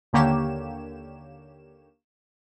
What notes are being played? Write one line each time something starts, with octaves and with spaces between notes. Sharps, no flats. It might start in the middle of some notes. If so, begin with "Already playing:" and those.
D#2 D3 A#3 G4 C#5 E7